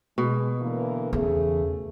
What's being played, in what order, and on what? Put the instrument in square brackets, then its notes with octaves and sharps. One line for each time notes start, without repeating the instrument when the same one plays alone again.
[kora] B2 [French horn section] G#3
[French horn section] D3 E3 A#3
[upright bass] E2 [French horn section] C#3 A3 G#4